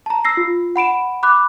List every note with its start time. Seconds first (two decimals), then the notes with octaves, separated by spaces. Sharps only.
0.06 A5 A#5
0.25 E6 A#6 C7
0.37 F4
0.76 F#5 B5 D7 E7
1.23 B5 D6 F#6